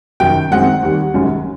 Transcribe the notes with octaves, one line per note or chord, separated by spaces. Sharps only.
F#1 F#2 D#3 G5
F#2 D#3 G#3 C4 F#5
D#2 D#3 G3
F#1 F#2 D#3 G#3 C#4